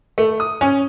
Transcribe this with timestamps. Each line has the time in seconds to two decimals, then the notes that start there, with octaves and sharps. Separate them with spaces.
0.18 A3
0.40 D#6
0.61 C#4